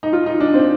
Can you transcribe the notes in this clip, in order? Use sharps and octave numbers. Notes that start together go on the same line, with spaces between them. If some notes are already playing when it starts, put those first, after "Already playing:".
D#4
F4
D#4
D4
C4